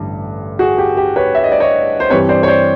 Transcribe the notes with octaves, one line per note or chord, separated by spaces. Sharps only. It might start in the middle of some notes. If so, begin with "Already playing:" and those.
Already playing: A1 G2 D3
F#4 G#4
G4
G4
B4 C#5
E5
D#5
D5
C#5 D#5
C5
G2 E3 G3 C4 B4 C#5
C5 D5
C#5
C5 D5